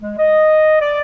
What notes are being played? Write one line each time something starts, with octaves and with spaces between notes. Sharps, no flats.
G#3
D#5
D5